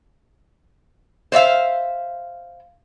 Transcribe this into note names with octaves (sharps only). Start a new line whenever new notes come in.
C5 D5 E5 F5